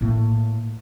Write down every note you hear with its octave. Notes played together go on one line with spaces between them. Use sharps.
A2 A#3